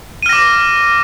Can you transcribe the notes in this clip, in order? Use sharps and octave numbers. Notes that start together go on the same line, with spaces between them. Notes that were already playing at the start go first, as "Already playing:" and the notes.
D6 F6 A#6 D#7